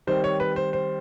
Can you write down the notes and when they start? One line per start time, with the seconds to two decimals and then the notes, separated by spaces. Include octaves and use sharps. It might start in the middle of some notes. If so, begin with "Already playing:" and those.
0.07 D#3 G3 C4 C5
0.24 C#5
0.40 B4
0.56 C5
0.73 C5